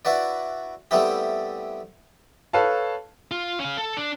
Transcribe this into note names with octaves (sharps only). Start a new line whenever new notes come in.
D4 E4 F#4 B4 D5
G3 A3 B3 C4 E4 G4
A4 B4 C#5 F5 A5
F4
C#4 F5
A4
D4